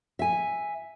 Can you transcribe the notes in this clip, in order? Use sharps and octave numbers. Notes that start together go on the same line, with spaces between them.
E5 G#5